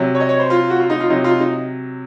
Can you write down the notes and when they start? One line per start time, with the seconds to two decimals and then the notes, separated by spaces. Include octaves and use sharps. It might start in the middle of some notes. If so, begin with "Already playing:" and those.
Already playing: C3 F#3
0.15 C#5
0.20 D#5
0.29 C#5
0.39 C5
0.50 F4
0.70 F#4
0.80 F4
0.90 D#4
1.00 F4
1.09 C3 F#3 D#4
1.24 F4
1.40 D#4